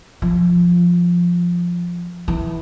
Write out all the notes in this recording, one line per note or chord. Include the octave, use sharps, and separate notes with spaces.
F3
E3